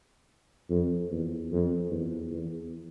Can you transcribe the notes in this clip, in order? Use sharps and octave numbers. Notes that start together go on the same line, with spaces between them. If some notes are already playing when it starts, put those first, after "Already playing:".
F2
E2
F2
E2
E2